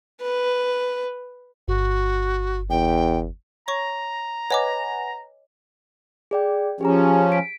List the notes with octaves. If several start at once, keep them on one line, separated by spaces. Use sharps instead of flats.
B4
G1 F#4
E2 G5
C#5 A#5 C#6
B4 C#5 D#5 F#5 G#5 D6
G#4 D5 G5
F3 C#4 G4 G#4 A#5
B6 D7